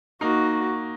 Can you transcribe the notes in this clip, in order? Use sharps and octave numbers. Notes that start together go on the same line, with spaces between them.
A#3 D#4 F#4